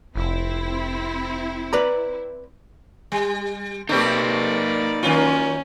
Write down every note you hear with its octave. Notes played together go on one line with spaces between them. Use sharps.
F1 C4 E4
B4 D5 A#5
G3
A3 A#3 C4 D#4 G4 B4 D5
D#3 F#3 C#4 F4